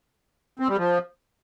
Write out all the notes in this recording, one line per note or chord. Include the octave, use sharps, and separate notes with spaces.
C4
G3
F3